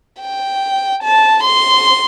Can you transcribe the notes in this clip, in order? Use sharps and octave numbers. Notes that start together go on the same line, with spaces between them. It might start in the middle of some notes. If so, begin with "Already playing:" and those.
G5
A5
C6